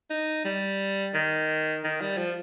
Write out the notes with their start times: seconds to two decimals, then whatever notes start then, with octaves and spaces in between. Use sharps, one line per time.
0.10 D#4
0.45 G3
1.14 D#3
1.84 D#3
2.01 G3
2.17 F3